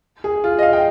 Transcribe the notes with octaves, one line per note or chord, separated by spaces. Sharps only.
G#4
F4
D#5
F5
G5